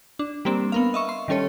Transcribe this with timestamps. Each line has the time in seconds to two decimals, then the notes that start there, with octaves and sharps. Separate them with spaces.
0.19 D4
0.45 G3 A#3 C4 D4
0.72 B3 A#4 F5
0.94 D#5 E5 C#6
1.09 C6
1.28 D#3 G3 C#4 A4 C#5